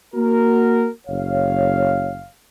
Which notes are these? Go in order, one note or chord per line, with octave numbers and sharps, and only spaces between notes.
A#3 F#4 A#4
F#1 C#5 F5